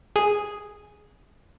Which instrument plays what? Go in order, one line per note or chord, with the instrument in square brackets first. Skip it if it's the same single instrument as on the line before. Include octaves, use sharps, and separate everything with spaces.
[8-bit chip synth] G#4